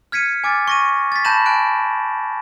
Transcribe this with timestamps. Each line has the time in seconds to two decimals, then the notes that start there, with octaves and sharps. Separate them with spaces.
0.12 F6 G#6 B6 C#7 D#7
0.44 G#5 D6 F6 A6
0.68 C#6 A#6 D#7
1.12 A6 B6
1.24 A5 B5 G6 A#6 E7 F#7
1.46 G#5 F#6 D7